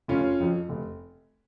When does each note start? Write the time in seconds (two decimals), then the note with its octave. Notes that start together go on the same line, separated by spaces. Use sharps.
0.08 F1 C#4 F4
0.40 F2 F3
0.69 F1